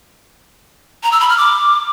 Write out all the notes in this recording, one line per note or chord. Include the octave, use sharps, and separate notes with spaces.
A#5
E6
B5
F6
D6